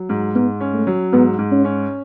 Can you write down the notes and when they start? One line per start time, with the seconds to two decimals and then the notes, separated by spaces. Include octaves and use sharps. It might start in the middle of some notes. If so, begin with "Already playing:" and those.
Already playing: F#3
0.09 G#2
0.35 G#2 B3
0.60 C#4
0.74 A3
0.87 F#3
1.12 G#2 B3
1.38 G#2
1.51 C#4
1.64 C#4